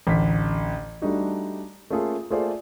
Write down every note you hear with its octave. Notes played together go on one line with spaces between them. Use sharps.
A1 D2 B6
G3 A3 D4 D#4 F#4
A3 A#3 C#4 F4 G#4 A4
A3 A#3 F4 G#4 C5 D5